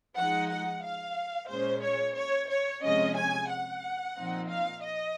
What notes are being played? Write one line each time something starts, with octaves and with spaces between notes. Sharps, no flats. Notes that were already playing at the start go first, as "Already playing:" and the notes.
F3 G#3 D#4 F#5
F#5
F5
A#2 G#3 C#4 C5
C#5
C#5
C#5
C3 F3 G#3 C#4 D#5
G#5
F#5
A#2 F3 C4 D#4
F5
D#5